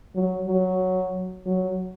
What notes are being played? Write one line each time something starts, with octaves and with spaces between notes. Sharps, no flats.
F#3
F#3
F#3